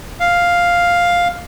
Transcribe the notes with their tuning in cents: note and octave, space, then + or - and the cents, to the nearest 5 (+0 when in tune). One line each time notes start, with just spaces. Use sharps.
F5 +5